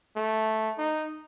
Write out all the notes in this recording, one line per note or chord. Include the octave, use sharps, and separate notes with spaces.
A3
D#4